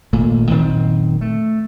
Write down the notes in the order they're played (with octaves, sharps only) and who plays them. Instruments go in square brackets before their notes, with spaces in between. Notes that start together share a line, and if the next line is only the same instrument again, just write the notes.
[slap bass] G#1 A#2 A3 A#3
F#1 A#2 D#3 C4
A3